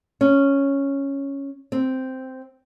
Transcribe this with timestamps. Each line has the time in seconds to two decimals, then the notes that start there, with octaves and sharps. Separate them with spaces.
0.21 C#4
1.72 C4